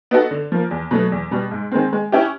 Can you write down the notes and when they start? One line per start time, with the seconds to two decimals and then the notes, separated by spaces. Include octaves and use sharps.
0.11 B3 D#4 F#4 A4
0.31 D3
0.52 F3 A#3
0.71 E2
0.91 B2 F#3 A3
1.12 E2
1.31 B2 G3
1.51 G#2
1.72 D#3 G#3 C4
1.93 G#3
2.12 C#4 E4 G4